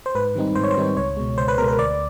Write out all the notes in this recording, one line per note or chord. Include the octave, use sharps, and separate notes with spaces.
C5
G#2 B4
D#3 G3 C4 D#4
G#2 C5
C#5
C5
D#3 G3 C4 D#4
C#2 C#5
B2 G#3
C#2 C5
B4
B2 G#3 A#4
A#4
D2 D5